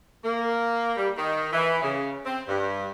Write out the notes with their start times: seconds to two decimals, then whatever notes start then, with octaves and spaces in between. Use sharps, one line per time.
0.24 A#3
0.97 G3
1.17 D#3
1.53 E3
1.82 C#3
2.25 C4
2.47 G2